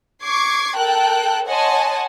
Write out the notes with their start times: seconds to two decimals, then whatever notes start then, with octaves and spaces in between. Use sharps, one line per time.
0.22 C#6 D6 G#6 C7
0.77 A4 A#4 G5 A5 F#6
1.47 C#5 D#5 F#5 G#5 A5 C6